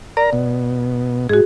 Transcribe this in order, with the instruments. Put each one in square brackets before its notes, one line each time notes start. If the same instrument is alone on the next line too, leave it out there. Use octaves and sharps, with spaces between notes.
[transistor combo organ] A#4 A#5 [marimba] D5
[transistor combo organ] B2
[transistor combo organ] G#2 [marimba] F#4 G#4